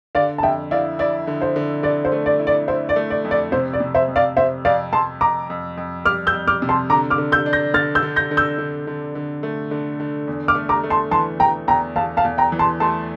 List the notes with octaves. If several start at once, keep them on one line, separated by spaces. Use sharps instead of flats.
D3 D5 F5
A5
F2 E5 G5
E4 D5 F5
E4 D5
D3
C5
D3
D3 D5
C5
A3
D5
E4
D5
E4 C5
D5
A3
D5
F2
D5
C3 C5
D5
C3
C5 E5
F2
D5 F5
C3 C5 E5
F2 D5 F5
F2 A5 C6
F2 A#5 D6
F2
F2
G3 D6 F6
E6 G6
F2
D6 F6
C3
A5 C6
D3 A#5 D6
D6 F6
D3
E6 G6
D4
G6 A#6
D3 F6 A6
E6 G6
D3
G6 A#6
D3
E6 G6
D3
D3
D3
A3
D3
D3
E2
D6 F6
A3
A#5 D6
A3
A5 C6
E3 A5 C6
E3 G5 A#5
E2 G5 A#5
E2 F5 A5
F5 A5
E2
G5 A#5
E3
A5 C6
A3 A5 C6